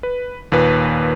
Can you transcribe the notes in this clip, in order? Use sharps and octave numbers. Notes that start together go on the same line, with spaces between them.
B4
D#2 A#2 B4